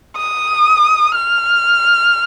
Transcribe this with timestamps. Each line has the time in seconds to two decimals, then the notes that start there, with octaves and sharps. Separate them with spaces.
0.16 D#6
1.15 F6